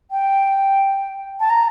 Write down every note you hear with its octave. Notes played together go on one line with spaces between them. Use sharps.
G5
A5
A#5